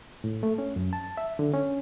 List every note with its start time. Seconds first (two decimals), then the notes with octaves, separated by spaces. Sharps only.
0.24 A2
0.43 A3
0.58 C#4
0.76 F#2
0.93 A5
1.17 E5
1.39 D3
1.53 C#4